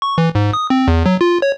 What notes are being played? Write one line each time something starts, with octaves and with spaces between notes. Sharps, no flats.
C#6
E3
G#2
D#6
C4
E2
F#3
F4
C#5